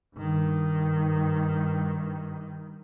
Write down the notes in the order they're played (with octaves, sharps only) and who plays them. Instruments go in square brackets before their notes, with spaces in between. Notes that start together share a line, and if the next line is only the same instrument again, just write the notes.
[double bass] G2 D#3